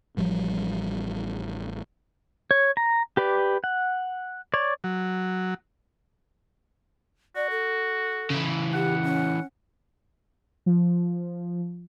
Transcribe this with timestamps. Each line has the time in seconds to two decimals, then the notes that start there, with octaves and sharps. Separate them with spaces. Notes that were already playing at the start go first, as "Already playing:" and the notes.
0.17 A1 F3 G3
2.51 C#5
2.77 A#5
3.17 G4 B4 D5
3.64 F#5
4.54 C#5 D5
4.84 F#3
7.36 F#4 D5
7.51 A4
8.30 C#3 E3
8.73 G4 F#5
9.03 C#4
10.66 F3